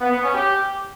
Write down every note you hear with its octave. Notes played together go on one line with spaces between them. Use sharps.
B3
B3
C#4
G4